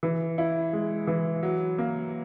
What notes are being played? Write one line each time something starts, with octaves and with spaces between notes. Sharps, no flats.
E3
E4
G#3
E3
F#3
A#3